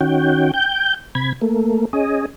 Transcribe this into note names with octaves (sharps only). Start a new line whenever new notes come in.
D#3 C#4 F#4 G5
G5 G6
C3 B5 G#6
A3 A#3
C#4 G#4 D#5